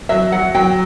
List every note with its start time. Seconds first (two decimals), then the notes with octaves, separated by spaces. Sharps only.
0.09 F#3 E5
0.32 F#3 F#5
0.54 F#3 G5